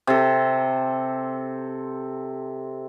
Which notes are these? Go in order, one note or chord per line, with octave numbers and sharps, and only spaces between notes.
C3 A4